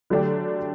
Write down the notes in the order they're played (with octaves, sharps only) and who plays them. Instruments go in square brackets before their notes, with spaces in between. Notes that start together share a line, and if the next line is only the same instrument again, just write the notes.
[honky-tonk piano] D3 F#3 A3 D4 G4